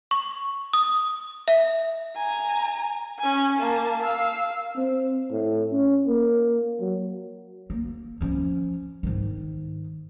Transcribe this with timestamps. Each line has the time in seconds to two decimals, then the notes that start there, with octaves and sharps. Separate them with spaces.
0.11 C#6
0.73 D#6
1.48 E5
2.16 G#5 A#5
3.19 C#4 G#5
3.58 A#3 A5
4.02 F5 E6
4.76 C4
5.31 A2
5.72 C#4
6.07 A#3
6.80 F#3
7.70 A#3
8.21 F3 C#4
9.03 G#2 D#3